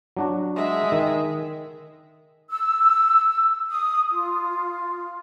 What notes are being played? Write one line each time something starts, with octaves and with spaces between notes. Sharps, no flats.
F#3 D4 F#4
G#3 E5
D#3
E6
D#6
F4